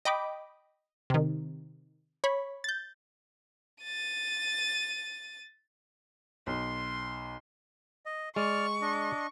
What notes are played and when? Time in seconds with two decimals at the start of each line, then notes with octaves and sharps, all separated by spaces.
0.05 D#5 G5 B5 D6
1.10 C3 D#3
2.24 C#5 B5
2.64 G6 A6
3.84 A6 D#7
6.47 B1 C6
8.06 D#5
8.36 G#3 D5 C#6 F6
8.82 D4 D#5